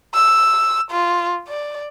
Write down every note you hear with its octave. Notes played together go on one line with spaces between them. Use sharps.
E6
F4
D5